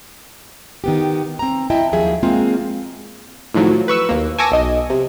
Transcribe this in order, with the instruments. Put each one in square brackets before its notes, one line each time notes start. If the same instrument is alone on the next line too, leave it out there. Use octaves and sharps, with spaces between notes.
[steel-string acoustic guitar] D#3 B3 G4
C4 A#5
E4 D#5 E5 G5 A5
D#2 F3 F#3 G#4 E5
G#3 A#3 C4 F4 G#4
[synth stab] A2 D#3 F3 F#3
B4 C#6 E6
D#2 A#3
G#5 A5 C#6 D6 E6 A#6
B1 D#5
C3